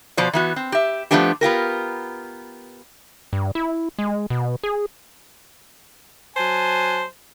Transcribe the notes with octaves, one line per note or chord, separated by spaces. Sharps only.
B2 F3 C5 D5
E3 B3 F#4
C4
G4 E5
F3 F#3 A3 B3 D4 G4
B3 F4 G4 A#4
G2
E4
G#3
B2
G#4
F#3 C5 G#5 A5